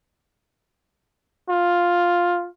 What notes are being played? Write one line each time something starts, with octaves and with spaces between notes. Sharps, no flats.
F4